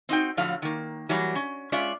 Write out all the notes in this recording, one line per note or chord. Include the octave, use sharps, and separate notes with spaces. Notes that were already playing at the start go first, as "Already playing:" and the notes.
C4 D#4 F#4 G5
A2 D3 F3 F#3 F5
D#3 A#3
E3 F#3 G3 A#3
C#4
G#3 C#4 F4 D5 E5